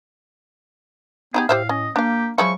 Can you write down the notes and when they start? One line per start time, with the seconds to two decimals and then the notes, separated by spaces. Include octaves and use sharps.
1.34 B3 D#4 E4 G4 G#4
1.49 A2 G4 C5 E5 F5
1.69 C#4 D#5
1.96 A#3 D4 G4 F5
2.38 F3 F#3 G#3 E4 C#6